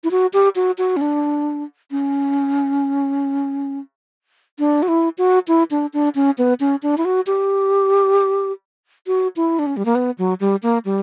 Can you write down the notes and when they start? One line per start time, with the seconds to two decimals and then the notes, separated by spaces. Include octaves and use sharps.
0.04 E4
0.11 F#4
0.33 G4
0.56 F#4
0.78 F#4
0.97 C#4
1.01 D4
1.91 C#4
4.59 D4
4.83 F#4
4.88 E4
5.18 F#4
5.48 E4
5.71 D4
5.93 D4
6.15 C#4
6.38 B3
6.60 C#4
6.83 D4
6.98 E4
7.05 F#4
7.27 G4
9.07 F#4
9.36 E4
9.59 D4
9.67 C#4
9.77 G3
9.85 A#3
9.95 B3
10.18 F#3
10.40 G3
10.63 A#3
10.85 G3